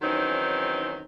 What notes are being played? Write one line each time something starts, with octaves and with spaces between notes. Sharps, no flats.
D#3 E3 F#3 C4 C#4 D#4